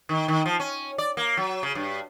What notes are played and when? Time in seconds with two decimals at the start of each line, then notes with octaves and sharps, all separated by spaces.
0.09 D#3
0.28 D#3
0.46 F3
0.60 C#4
0.98 D5
1.17 A#3
1.37 F#3
1.63 C#3
1.75 G2